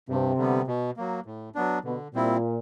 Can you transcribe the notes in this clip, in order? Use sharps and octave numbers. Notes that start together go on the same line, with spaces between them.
G2 C3
D3 G3 B3
B2
F#3 A#3
A2
F#3 B3 D4
B2 D3
A#2 G3 C4 E4